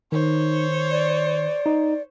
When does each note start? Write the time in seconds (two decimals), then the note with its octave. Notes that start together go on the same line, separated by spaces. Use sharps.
0.12 D#3 D#4 C5 C#5
0.91 D5
1.66 D#4